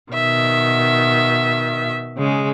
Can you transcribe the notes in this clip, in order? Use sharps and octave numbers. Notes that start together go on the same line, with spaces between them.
B2 D#3 E5
C#3 G#3